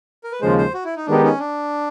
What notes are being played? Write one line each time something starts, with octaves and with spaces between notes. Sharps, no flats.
A#4
B4
D#2 C#3 F3 G#3 C5
C5
F#4
E4
D#4
D#3 G#3 B3 D4 D#4 G4
C#4
D4